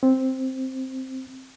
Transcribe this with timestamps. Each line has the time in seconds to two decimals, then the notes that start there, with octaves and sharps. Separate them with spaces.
0.03 C4